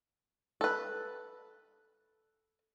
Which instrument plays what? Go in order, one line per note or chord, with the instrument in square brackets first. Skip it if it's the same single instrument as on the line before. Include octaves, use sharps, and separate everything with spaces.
[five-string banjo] A4 B4